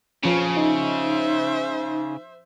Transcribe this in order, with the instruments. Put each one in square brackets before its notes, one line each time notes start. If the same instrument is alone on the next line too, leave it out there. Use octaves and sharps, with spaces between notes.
[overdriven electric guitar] C#3 [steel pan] F3 C#4
[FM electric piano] D#4 [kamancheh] C5 E5